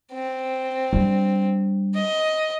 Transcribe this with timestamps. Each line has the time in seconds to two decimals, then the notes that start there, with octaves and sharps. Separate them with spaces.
0.13 C4
0.93 G3 D4
1.94 D#5